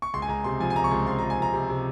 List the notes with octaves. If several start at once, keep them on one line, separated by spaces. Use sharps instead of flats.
C#6
C#2 C6
G#5
C#2 A#5
C3 C6
F3 G#5
G#5
C#2 A#5
C#6
C#2 C6
F3 C6
A#5
C#2
G#5
F3 A#5
C3
C3